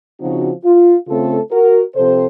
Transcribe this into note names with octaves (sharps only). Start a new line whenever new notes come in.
C#3 F3 C4 D#4 F#4
F4
C#3 A3 C4 F4 A4
F#4 A#4
C3 F3 C4 A4 C5